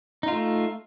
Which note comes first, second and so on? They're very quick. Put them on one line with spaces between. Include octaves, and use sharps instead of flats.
D#4 F4 A3